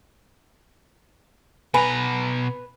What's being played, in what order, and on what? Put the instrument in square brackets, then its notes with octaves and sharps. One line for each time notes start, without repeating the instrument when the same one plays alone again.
[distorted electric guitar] B2 A#5 [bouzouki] B4 [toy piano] G#5